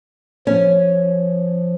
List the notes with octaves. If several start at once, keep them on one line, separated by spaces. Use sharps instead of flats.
F3 C#4